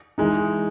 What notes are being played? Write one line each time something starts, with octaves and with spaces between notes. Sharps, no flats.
E3 G#3 D#4